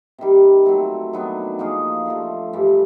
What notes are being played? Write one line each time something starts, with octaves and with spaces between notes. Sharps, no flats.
C3 D#3 G3
F#3 A3 C4
D#3 F#3 B3 D4
F3 A#3 D#4 G#4
D3 F3 A3
G2 E3 A3